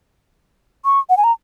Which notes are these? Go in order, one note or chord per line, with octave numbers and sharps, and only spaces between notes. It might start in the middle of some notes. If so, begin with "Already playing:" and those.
C#6
F#5
G#5
A#5